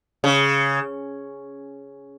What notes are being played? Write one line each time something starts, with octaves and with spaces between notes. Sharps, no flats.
C#3